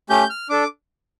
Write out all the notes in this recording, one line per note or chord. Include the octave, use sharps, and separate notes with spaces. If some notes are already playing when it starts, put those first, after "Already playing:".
A3 C#4 G4 G6
F6
D4 A4 D6